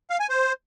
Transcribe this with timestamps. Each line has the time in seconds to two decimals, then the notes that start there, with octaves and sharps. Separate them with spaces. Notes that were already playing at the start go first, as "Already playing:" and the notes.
0.10 F5
0.20 G#5
0.30 C5